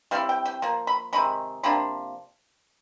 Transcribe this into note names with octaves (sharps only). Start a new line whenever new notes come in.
G3 C4 E4 F5
G5
G5
F3 A#3
B5
C3 D#3 G#3 B5
C3 F3 A#3 D4 B5